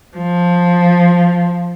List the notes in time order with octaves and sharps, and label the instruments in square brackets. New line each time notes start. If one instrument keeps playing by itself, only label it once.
[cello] F3